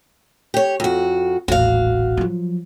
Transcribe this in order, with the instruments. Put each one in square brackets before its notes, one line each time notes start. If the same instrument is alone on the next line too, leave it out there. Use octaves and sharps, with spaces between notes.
[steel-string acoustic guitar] G4 C#5
F2 F#4
[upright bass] D#1 A1 [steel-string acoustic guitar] F#4 F5
[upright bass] F3 F#3